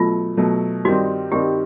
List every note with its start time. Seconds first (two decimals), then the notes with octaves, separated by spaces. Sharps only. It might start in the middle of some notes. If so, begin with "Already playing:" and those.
Already playing: B2 F#3 A3 F4
0.37 B2 F#3 A3
0.85 G2 D#3 G3 C4 D#4 F#4
1.32 G2 D#3 G3 C4 D#4 G4